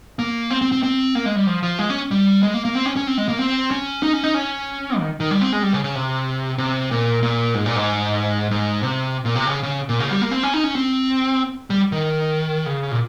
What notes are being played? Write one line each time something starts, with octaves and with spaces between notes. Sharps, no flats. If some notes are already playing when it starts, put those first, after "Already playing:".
A#3
C4
C4
C4
C4
A#3
G#3
G3
F3
F3
G#3
C#4
G3
G#3
A#3
A#3
C4
C#4
C#4
C4
G#3
A#3
C4
C#4
D#4
C#4
D#4
C#4
D#3
D#3
G3
C4
G#3
G3
C#3
C#3
C3
C3
A#2
A#2
G#2
A#2
G#2
G#2
C3
A#2
C3
C#3
C#3
A#2
C#3
G3
A#3
C4
C#4
D#4
C#4
C4
G3
D#3
C#3
A#2